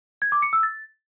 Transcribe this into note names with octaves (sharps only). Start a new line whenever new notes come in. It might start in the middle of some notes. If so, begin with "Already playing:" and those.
G#6
D6
C#7
E6
A6